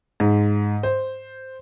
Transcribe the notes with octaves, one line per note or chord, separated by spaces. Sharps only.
G#2
C5